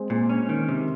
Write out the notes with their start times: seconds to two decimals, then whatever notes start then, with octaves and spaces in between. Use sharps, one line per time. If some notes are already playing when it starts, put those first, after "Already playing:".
Already playing: G#3 C4
0.10 A#2
0.29 C#4
0.49 D#3
0.68 C3